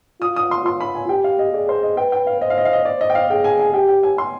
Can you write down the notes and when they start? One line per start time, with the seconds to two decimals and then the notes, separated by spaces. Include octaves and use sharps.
0.21 F4 D#6
0.36 D#6
0.51 C6
0.65 F4 C6
0.81 B5
0.95 G#5
1.09 G4 G5
1.24 F5
1.39 D#5
1.53 G#4 D5
1.69 C5
1.83 D#5
1.97 B4 G5
2.12 G5
2.27 F5
2.41 C5 D#5
2.50 F5
2.58 D#5
2.65 F5
2.73 D#5
2.85 C5 D5
3.01 D#5
3.10 G5
3.15 F5
3.30 G#4 G5
3.44 G#5
3.59 G#5
3.74 G4 G5
3.88 G5
4.03 G#5
4.18 C6